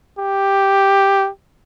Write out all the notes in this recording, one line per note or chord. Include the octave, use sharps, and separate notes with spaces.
G4